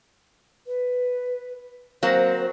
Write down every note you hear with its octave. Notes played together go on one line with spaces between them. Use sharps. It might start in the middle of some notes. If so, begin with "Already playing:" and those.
B4
F#3 A#3 C4 C5